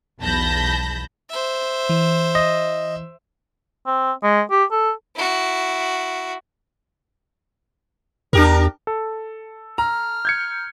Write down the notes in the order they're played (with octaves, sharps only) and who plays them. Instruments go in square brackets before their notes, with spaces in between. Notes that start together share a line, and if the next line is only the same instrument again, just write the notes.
[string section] B1 E2 A5 B5 G6 A#6
[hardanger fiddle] C5 E5
[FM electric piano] E3
[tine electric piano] D#5
[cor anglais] C4
G#3
G4
A4
[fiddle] E4 F#4
[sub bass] E2 [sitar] D4 G4 A#4
[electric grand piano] A4
[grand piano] A#5 [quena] F6
[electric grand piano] G6 G#6 C#7